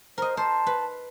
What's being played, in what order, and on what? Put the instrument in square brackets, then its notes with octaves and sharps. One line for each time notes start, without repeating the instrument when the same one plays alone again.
[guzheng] A#4 D#5 [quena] C5
[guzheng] C5 [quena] A5
[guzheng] B4